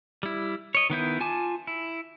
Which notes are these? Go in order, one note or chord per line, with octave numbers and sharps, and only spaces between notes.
G3 E4
C#5 D#5
D#3 B3 E4 G6
F4 G#5 A5 D6
E4